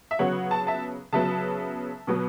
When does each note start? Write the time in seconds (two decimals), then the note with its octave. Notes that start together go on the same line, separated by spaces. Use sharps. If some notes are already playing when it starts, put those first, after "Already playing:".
0.11 E5
0.19 C#3 F#3 B3 C#5 F#5
0.51 A5
0.67 E5 A5
1.13 C#3 F#3 B3 E5 A5
2.07 B2 F#3 B3